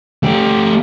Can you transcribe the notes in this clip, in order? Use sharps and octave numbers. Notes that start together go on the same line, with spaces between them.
A3 G4